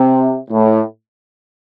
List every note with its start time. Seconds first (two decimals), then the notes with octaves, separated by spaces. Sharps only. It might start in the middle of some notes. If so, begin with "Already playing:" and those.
Already playing: C3
0.51 A2